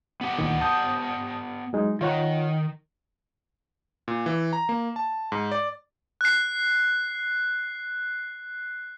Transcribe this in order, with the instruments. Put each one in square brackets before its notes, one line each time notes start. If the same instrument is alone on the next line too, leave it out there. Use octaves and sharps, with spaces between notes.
[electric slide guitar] B3 G4 F#5
[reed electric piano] D2 A#2 D#3
A5 D#6 G6
F#3 G#3 D#4
[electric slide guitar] D#3 [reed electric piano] F4 C#5 F#5
[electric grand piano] A#2
E3
A#5
A#3
A5
G#2
D5
[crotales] F#6 C7